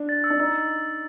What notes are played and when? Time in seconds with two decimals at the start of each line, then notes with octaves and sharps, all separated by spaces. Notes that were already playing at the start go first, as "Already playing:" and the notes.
Already playing: D4
0.09 A6
0.24 E6
0.30 D4
0.39 D#4 E6